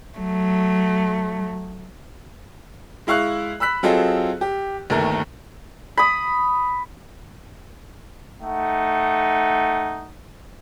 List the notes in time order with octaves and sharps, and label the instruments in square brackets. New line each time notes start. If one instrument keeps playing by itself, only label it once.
[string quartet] F#3 A3
[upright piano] G#3 E4 F5 C#6 F#6
B5 E6 F#6 B6
F#3 C4 F4 G#4 A4 D#5
G4
G1 D#2 D#3 A3 A#4
[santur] B5 D#6
[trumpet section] A3 D#4 F#5